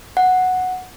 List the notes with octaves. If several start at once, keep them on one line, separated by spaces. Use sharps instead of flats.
F#5